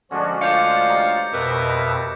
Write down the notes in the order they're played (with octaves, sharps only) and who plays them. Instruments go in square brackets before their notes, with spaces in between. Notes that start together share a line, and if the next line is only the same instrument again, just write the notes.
[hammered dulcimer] D3 G#3 D4 [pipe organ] F3 C#4 F#4
[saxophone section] D2 C#4 F5 [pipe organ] F4 [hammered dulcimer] C5 [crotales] D6 G6 C#7
[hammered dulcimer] G4 D#5 A#5
[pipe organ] F2 B2 E5 [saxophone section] A#4 B4